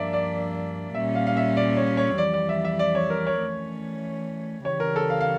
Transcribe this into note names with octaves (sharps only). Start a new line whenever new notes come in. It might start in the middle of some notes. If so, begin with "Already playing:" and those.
Already playing: G2 F3 A#3 D4 D5 E5
D5
A#2 G3 C#4 E5
F5
F5
E5
D5
C#5
C#5
F2 E3 G3 D5
D5
E5
E5
D5
C#5
A#4
C#5
E3 A3 C#4
C#3 E3 G3 C#5
A#4
A4
F5
F5